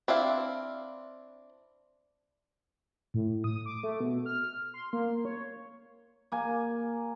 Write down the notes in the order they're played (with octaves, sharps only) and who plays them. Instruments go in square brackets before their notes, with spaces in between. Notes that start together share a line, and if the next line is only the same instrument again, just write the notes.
[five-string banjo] C4 D4 E4 F5
[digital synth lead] A2
D#6
D6
A3
B2
F6
C6
A#3
C#5
[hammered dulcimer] A#3 G#5